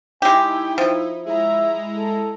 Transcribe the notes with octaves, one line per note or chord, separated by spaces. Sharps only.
G#3 D#4 E4 G4 G5
F3
G#3 E4 E5 A#5
A4